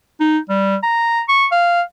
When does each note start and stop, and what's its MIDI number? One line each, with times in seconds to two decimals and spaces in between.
0.20 0.38 63
0.49 0.76 55
0.83 1.22 82
1.28 1.47 85
1.52 1.82 77